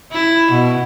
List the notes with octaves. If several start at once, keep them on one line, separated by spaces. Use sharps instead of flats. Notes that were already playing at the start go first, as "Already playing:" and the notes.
E4
B2